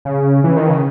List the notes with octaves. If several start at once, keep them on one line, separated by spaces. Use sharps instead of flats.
C#3
E3
D#3
C#3